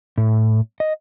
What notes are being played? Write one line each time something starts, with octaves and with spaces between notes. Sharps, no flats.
A2
D#5